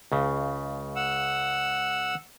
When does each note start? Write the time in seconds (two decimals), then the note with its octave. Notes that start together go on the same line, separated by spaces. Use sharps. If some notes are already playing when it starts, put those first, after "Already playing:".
0.12 C#2 C#3
0.96 F#5 E6